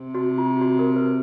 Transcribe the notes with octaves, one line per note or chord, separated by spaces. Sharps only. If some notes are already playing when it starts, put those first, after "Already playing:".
Already playing: C3
F#4
F4
F#4
A#4
B4